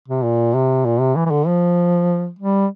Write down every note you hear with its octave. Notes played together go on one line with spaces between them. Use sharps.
C3
A#2
C3
A#2
C3
E3
E3
D3
F3
G3